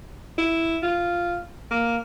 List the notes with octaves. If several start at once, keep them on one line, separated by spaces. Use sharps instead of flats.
E4
F4
A#3